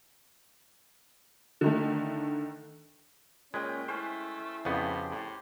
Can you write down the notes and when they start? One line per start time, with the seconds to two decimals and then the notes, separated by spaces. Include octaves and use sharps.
1.61 D3 D#3 A3
3.54 A#2 G#3 C#4 B4 G5
3.88 A3 C#4 E4 B4 C5
4.65 F2 A2 C#3 B3 G4 G5
5.11 A2